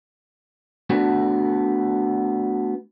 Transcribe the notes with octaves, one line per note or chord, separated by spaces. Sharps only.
A3 B3 D4 F#4